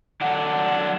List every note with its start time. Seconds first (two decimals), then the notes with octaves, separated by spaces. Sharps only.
0.21 F#3 D4 F#5